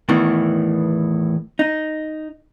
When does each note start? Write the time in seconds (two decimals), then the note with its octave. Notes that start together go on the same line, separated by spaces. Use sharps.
0.09 E2 A2 D#3 E3 B3
1.59 D#4